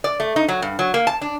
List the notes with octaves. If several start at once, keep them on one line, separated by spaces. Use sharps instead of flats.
D5
A3
D#4
F#3
G2
F#3
A#3
A5
D4